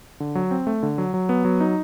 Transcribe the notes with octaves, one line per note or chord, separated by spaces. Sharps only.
D3
F#3
C4
A3
D3
F#3
F#3
B3
F#3
D#4